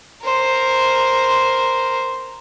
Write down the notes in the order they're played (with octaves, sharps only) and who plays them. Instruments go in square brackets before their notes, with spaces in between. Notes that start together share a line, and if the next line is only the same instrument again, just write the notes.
[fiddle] A#4 C5